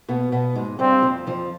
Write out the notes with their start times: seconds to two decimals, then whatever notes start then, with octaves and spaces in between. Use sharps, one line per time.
0.08 B2 B3
0.32 B2 B3
0.56 G#2 G#3
0.79 G2 G3 C4
1.02 F2 F3
1.27 F2 F3